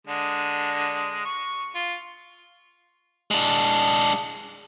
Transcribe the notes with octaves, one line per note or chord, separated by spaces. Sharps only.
D3 G#3
C#6
F4
G#3 D4